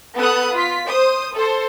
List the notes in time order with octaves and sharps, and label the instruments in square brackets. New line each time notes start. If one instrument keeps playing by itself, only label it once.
[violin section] B3 A4 D#6 F#6
F4 B6
C5 D#6
A4 C5